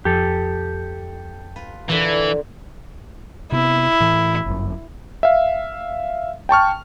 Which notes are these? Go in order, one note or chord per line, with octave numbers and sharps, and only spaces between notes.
F2 G4 A4
F4 B4
A#2 D3 E3
C3 B3 E4
A2 E3
G1 F#2
E5 F5
G5 A5 C#6 F6